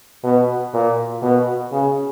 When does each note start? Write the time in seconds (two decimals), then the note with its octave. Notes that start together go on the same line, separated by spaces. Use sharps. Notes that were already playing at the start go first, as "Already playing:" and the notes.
0.24 B2
0.74 A#2
1.22 B2
1.72 C#3